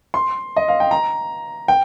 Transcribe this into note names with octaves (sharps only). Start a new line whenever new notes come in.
C6
D#5
F5
G5
A#5
G5